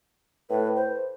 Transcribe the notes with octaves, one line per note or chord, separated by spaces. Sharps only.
A2 B4
C5